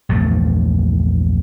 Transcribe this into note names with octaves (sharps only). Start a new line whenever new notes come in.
A#1 E2 G2 A3